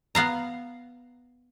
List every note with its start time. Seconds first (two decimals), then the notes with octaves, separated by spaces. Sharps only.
0.15 B3 F5 A#5